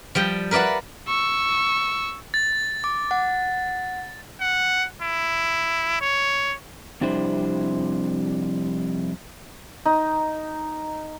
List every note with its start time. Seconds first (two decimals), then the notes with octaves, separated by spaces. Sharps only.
0.15 F3 G3 G5
0.51 A#4 B4 D5 E5 F#5
1.08 C#6 E6
2.34 A6
2.84 D6
3.11 F#5
4.41 F#5
5.02 E4
6.01 C#5
7.01 F2 C3 G3 D4 E4 C5
9.85 D#4